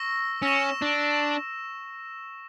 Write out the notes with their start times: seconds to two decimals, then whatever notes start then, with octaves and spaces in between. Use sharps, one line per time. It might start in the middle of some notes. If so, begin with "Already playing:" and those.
Already playing: C#6 E6 A#6
0.42 C#4 E6 A#6 E7
0.82 D4